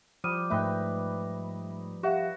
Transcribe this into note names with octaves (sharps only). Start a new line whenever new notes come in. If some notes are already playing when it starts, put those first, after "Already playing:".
F3 G3 D#6 F6 D#7
G#2 A3 D#4 B4 D#5 E5 G5
F#4 G4 E5 F5